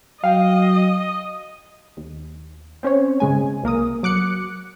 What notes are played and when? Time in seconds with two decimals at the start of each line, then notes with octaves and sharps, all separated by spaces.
0.24 F#3 D#5 F5 G5
1.97 D#2
2.83 C4 C#4 C5 C#5
3.20 G#1 C#3 G#3 G#5
3.63 C2 A#3 A#4 D#6
4.03 F#3 D6 F#6 C#7